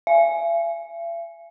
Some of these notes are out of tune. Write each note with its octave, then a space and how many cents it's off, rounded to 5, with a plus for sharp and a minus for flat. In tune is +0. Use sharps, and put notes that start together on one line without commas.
E5 +45